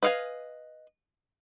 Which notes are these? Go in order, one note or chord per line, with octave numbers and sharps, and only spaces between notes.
B4 D#5 F5 F#5 G#5